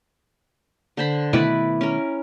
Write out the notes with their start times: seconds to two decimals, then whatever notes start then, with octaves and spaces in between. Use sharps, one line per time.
0.97 D3 C5 B5
1.33 B2 D#3 A3 E4 B4 D5
1.81 C#4 A#4